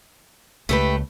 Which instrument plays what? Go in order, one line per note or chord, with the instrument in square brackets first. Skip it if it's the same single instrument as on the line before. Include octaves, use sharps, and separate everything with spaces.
[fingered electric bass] C#2 [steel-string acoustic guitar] A3 G4 B4